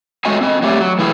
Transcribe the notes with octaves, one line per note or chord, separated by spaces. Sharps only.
G#3 A3 F#4 C#5 D#5 G#5
C4 D#5
F#3 A3 G4 C#5 D5
F#3
E3 A3 E4 G#4 G5